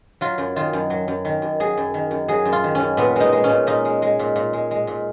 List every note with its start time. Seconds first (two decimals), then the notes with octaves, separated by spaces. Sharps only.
0.21 F#3 F4
0.38 F#2
0.56 D#3 F4
0.73 F#2
0.90 F#3
1.08 F#2
1.25 D#3
1.42 F#2
1.60 F#3 G#4
1.77 F#2
1.94 D#3
2.11 F#2
2.28 F#3 G#4
2.45 F#2
2.52 F4
2.64 D#3
2.75 F#2 C#4
2.97 A#2 B3
3.16 G#3 D#4
3.33 G#3
3.44 C#4
3.49 A#2
3.67 A#2 D#4
3.85 G#3
4.02 G#3
4.19 A#2
4.36 A#2
4.53 G#3
4.71 G#3
4.87 A#2